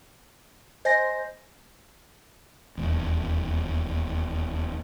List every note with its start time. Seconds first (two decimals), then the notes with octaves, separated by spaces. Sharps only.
0.85 C5 D#5 G#5 A#6
2.78 D#1 E2